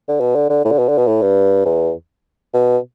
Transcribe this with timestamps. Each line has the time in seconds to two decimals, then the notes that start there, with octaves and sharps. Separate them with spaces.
0.09 D3
0.20 B2
0.35 D3
0.49 D3
0.64 A2
0.72 D3
0.79 B2
0.89 D3
0.98 B2
1.07 A2
1.22 G2
1.65 E2
2.54 B2